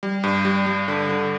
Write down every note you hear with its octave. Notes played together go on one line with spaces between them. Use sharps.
G3
G2
G3
G3
D3
D3